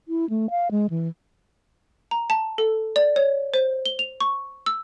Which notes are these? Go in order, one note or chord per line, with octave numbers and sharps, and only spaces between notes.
E4
A3
F5
G#3
E3
A#5
A5
A4
D5
C#5
C5
G7
F7
C#6
E6